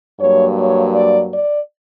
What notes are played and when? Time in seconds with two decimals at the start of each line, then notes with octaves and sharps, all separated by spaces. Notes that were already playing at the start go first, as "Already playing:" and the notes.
0.20 G2 F#3 A#3 C#5
0.58 C#5
0.95 D5
1.32 D5